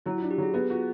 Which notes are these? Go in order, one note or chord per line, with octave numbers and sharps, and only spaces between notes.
F#3 E4
D4 F4
G4
F#3 G#4
B3 G#4
F4 F#4